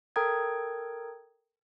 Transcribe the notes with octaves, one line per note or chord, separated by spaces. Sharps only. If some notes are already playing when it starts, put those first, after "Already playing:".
A4 A#4 G5 A#5 D#6 G#6